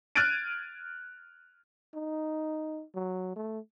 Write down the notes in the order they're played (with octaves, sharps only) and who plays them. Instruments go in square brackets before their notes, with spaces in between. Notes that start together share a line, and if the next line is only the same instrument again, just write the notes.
[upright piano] F6 F#6 G#6 A6 D7 D#7
[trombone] D#4
F#3
A3